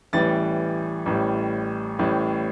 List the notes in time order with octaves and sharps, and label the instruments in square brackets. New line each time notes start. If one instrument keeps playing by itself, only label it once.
[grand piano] A1 A2 E3 G3 A6
A1 A2 G3
A1 A2 G3